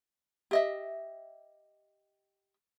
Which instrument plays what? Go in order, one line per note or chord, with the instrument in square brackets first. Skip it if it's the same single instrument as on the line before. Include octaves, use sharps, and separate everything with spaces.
[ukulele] G4 D#5 E5